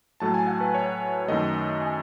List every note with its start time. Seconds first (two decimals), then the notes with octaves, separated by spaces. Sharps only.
0.20 A2 F#3 A3 A5
0.34 G#5
0.47 F#5
0.61 B4
0.74 C#5
1.28 F#2 D#3 A3 D#5
1.82 G#5